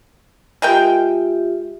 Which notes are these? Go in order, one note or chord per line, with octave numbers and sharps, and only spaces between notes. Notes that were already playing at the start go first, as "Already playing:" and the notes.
G#3 F4 G4 A#4 E5 G5